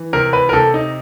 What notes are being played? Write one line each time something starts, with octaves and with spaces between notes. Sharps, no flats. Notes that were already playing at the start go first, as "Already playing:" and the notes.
Already playing: E3
C3 A#4
B4
A#4
C3 A4
D#4